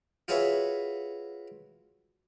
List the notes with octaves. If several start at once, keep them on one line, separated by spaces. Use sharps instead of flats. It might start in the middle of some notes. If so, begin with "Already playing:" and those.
F4 F#4 G#4 B4 C#5 E5